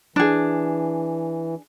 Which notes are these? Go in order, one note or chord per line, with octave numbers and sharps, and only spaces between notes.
E3 D4 G#4